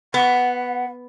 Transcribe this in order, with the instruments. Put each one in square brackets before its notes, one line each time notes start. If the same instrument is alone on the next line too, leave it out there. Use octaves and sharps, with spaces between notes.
[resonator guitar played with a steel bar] B3 [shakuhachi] F#5